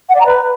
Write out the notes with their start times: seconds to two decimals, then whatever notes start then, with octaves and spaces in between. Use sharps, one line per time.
0.09 F#5
0.15 D5
0.20 A#5
0.26 B4